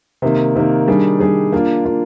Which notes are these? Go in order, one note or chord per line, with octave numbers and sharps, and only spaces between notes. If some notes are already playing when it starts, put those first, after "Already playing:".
C3 D#3 A#3
C3 D#3 A#3
D#3 G3 D4 G#4
D#3 G3 D4 G#4
A#3 D4 F4
A#3 D4 F4